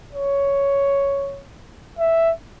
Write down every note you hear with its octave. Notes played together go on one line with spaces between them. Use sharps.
C#5
E5